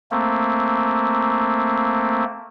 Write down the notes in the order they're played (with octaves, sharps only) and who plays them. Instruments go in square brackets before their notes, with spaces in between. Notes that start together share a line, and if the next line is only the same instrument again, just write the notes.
[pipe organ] A3 A#3 C4